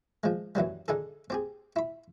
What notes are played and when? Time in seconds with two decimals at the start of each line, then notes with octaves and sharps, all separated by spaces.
0.24 F3 G#3
0.55 F#2 E3 F#3 G3
0.88 D3 D#4 G#4 A4
1.30 C4 G4 G#4
1.76 E4 B5